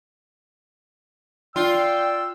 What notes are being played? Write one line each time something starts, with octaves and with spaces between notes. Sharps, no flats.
F4 D5 G5 E6